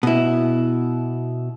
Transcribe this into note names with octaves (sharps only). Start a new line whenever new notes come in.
B2 E4